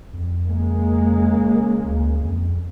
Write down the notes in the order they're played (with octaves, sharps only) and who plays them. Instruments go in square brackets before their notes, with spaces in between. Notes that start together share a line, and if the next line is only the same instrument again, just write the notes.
[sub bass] F2
[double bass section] C#3 G#3 A#3
[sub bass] D2
F2